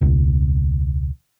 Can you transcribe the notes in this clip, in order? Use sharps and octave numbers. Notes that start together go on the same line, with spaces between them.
E1 C#2